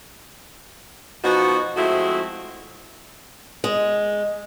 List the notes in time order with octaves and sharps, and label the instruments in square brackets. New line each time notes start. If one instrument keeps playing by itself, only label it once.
[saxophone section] B2 F3 D#4 F#4
F3 G#3 A3 C4 E4 F#4
[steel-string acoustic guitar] G#3